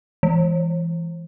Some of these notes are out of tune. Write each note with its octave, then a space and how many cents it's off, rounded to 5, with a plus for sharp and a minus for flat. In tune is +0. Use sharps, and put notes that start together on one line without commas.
E3 +20